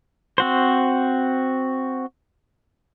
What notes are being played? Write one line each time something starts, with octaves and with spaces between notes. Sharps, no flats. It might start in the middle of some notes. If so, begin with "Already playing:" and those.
C4 F#4 C5